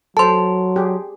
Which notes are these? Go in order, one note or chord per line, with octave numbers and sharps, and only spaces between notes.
F#3 A4 C5 A5 C6
G4 G#4